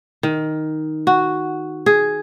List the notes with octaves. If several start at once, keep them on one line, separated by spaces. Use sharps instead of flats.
D#3
F#4
G#4